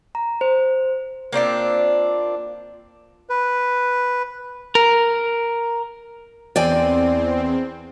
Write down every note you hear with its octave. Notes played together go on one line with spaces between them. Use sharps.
A#5
C5
A#3 C4 D4 F4
B4
A#4
E2 C4 D5 G5 G#5